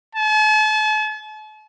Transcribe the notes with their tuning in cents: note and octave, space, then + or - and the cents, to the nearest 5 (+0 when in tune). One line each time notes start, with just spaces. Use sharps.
A5 -45